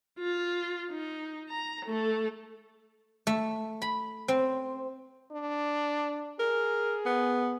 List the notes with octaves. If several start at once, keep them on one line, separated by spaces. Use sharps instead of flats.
F4
D#4
A#5
A3 A4
A3
B5
C4
D4
G#4 A#4
B3